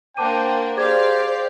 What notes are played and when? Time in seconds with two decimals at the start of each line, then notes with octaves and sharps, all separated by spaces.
0.17 A#3 D4 C5 F#5 G5 A5 D6 D#7
0.77 G4 G#4 C5 D5 F5 D6 G#6